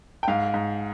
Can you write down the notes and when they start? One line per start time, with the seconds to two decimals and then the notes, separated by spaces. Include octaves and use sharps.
0.23 G5
0.28 G#2 F5
0.54 G#2